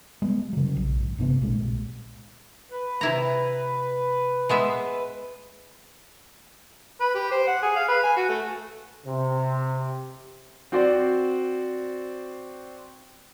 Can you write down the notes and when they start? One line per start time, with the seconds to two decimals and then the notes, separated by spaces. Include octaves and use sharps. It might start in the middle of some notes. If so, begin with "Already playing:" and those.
0.22 G3 G#3 B3
0.53 C#3 F#3
0.76 A#1
1.00 G#1
1.18 G1 C3 B3 C4
1.41 B1 A#2 G#3
2.71 B4
3.01 C3 E4 A#5
4.49 G#3 B3 E5
7.01 B4
7.15 G4
7.31 C5
7.47 F#5
7.63 G#4
7.76 F5
7.88 B4
8.03 G#5
8.16 F#4
8.29 A3
9.06 C3
10.72 C4 F#4 C5 D5